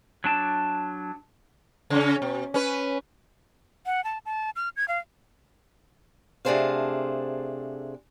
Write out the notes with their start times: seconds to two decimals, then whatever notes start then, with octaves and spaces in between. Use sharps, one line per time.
0.24 F#3 D4 A5
1.90 C#3 C#4
2.22 B2
2.54 C#4 B4
3.86 F#5
4.04 A5
4.26 A5
4.56 F6
4.77 G#6
4.88 F5
6.45 C3 A3 D4 G#4 C5 F5